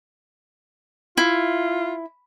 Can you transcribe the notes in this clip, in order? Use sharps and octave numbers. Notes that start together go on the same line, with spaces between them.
E4 F4